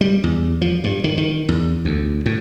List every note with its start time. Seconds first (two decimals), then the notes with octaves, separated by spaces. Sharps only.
0.01 G3
0.24 E2
0.61 F3
0.84 G2
1.04 D#3
1.18 D#3
1.49 E2
1.85 D2
2.26 A2